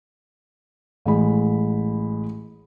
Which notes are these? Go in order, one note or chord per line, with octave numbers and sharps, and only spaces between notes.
A1 G#3 B5